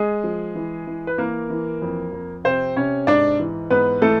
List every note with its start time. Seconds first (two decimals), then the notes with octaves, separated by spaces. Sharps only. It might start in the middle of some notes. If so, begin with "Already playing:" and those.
Already playing: G#3 G#4
0.24 F3
0.55 E3
0.87 E3
1.07 B4
1.18 E3 A#3 A#4
1.50 E3
1.82 F2
2.13 F2
2.44 C3 C4 C5
2.76 C3 C#4 C#5
3.07 G#2 D4 D5
3.39 E3
3.70 G#2 B3 B4
4.02 E3 A3 A4